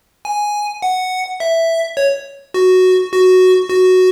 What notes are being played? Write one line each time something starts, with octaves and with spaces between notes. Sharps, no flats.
G#5
F#5
E5
C#5
F#4
F#4
F#4